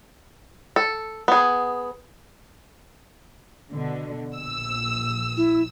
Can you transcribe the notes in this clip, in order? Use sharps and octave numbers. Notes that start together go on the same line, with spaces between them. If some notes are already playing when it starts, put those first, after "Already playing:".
A4
B3 G#4
B2 D3
A#1 E6
E4